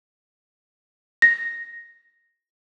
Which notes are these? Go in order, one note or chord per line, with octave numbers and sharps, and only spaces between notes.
A#6